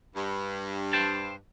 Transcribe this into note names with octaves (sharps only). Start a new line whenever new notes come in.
G2
C5 G5 A5